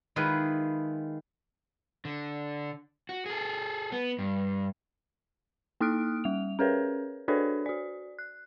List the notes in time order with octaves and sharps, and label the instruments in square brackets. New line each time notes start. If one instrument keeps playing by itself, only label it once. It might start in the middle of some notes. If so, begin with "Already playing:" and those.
[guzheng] D#3 G#3 E4 F4 G#4 B4
[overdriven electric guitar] D3
F#4
G#4 A4
B3
G2
[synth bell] A#3 D#4 D#6 F6 F#6 D7
G3 F7
C#4 G#4 A#4 B4 C#5
D4 F#4 A4 B4 C#5 D5
F#4 D5
F#6